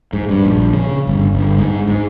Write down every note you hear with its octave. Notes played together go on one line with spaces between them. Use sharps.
G#2
G2
A#1
C#3
G1
G1
G#2
G#2